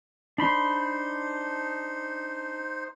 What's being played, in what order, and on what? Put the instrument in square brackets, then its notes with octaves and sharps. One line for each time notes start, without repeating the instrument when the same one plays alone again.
[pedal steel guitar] D4 B5 C6 [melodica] D#4 C5